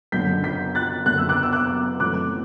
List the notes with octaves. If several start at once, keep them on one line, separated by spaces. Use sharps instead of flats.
F#1 F#2 D3 G6 B6
G6 B6
F#6 A6
F#1 F#2 D3 F#6
E6
D6 F#6
E6
D6 F#6
F#2 E3 A3 C4 D6 F#6